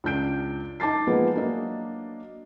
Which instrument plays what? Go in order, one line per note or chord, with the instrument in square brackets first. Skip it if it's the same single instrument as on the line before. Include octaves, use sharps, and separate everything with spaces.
[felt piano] C#2 D4 G6 D7
D#4 A5 D6 A6 C7
F3 G#3 A#3 B3 G#4 B4
F#3 A#3 D4 D#5